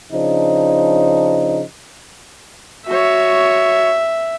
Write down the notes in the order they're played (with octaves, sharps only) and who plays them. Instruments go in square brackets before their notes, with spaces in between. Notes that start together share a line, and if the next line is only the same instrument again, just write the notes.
[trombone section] C#3 F3 D4 D#4
[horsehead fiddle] F#4 C#5 [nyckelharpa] E5